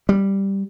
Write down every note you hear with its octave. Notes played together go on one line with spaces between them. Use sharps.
G3